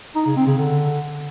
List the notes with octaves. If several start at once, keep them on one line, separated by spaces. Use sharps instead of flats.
D#4
C#3
C4
C#3
D3